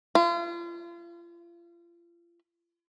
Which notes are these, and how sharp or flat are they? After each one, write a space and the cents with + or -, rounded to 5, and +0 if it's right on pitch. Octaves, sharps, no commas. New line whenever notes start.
F4 -35